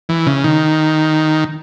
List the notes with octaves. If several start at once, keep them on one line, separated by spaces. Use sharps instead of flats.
E3
C#3
D#3